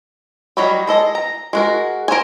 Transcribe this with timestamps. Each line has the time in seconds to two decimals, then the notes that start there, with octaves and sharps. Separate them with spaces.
0.57 F#3 G3 C#5 D#5 B5
0.87 G#3 A4 D#5
1.15 A#5
1.53 G#3 F#4 A#4
2.08 A#4 C5 C#5 G#5